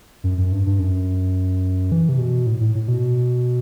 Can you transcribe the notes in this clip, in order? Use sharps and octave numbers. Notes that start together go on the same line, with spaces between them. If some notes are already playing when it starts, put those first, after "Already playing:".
F#2
F#2
G2
G2
F#2
E3
C3
B2
A2
A2
A2
B2